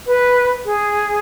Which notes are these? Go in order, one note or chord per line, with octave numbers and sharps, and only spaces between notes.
B4
G#4